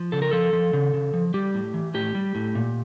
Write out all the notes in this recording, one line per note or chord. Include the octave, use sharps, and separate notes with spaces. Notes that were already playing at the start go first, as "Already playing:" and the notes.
Already playing: F3
C#3 A4
A#4
F3 A4
F3
C#3
C#3
F3
G3 G4
A2
E3
A2 G4
G3
A2
A#2